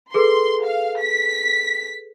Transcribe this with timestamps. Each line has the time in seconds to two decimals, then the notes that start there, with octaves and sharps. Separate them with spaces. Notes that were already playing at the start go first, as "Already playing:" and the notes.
0.14 G#4 A4 B4 C6
0.65 F5
1.01 B6